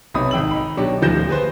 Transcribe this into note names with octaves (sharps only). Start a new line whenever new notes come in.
B1 C3 F#3 B5 D#6
G#1 G5 E6 F#7
D#4 B5
B2 F#3 D4 G4
D#1 D2 F3 G6 A#6 E7
G#4 B4 C5